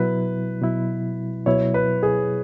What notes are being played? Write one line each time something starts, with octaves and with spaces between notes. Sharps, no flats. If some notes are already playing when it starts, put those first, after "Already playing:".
Already playing: B2 F#3 E4 B4
B2 F#3 E4
B2 F#3 E4 C#5
B4
G#4